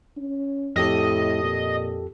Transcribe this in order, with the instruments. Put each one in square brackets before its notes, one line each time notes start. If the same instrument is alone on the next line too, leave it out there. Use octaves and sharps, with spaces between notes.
[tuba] C#4
[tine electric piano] F2 G4 A4 [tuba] A2 [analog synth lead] D#5
[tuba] A#2